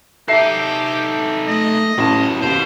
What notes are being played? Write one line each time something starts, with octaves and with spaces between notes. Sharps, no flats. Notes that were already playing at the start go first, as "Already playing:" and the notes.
D#4 G4 A4 E5 C7
A3 D#5
A1 F#2 E4 A5
D#2 B2 C5